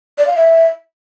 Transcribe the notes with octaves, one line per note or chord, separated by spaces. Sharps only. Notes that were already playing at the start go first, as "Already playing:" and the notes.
D5
F5
E5